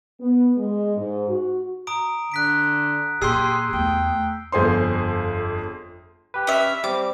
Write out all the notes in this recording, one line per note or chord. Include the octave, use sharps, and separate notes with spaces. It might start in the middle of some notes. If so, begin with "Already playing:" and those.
B3
G#3
G#2
F#4
A#5 D#6 D7
D3 F#6 B6 D7
A#2 G4 G#4 C6 E6 C7
E2 A3 G5
G1 F2 G#4 C5 C6
G4 B4
C#4 E5
G3 C4 D6